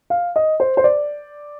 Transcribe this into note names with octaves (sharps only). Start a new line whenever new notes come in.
F5
D#5
C5
C5
D5